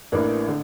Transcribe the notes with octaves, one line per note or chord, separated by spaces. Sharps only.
A1 A2 E3 A#3 D4
D3